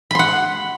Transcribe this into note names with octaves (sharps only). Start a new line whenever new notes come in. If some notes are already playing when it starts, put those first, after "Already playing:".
F#5 B5 C6